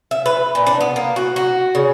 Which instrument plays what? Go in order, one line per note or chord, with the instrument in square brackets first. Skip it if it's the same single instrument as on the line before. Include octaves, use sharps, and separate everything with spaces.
[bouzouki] E5
B4
A#2
D4
B3
A#3
F#4
F#4
C#3